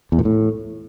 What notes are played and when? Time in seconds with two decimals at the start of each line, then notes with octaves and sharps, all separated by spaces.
0.12 E2
0.19 A#2
0.25 A2